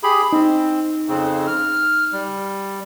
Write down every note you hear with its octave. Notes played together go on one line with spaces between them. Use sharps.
G4 G#4 B5
C4 D#4
F2 C#3 C4
F6
G3